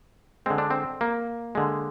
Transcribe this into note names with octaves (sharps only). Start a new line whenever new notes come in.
D3 G#3 C4
D4
C4
A#3
D3 G#3